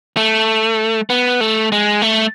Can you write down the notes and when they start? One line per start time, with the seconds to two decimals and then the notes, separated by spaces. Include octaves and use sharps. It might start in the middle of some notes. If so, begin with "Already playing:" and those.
0.17 A3
1.10 B3
1.41 A3
1.72 G#3
2.02 A3